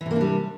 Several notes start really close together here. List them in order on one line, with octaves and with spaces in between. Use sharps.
E3 C3 A#3 D4 G3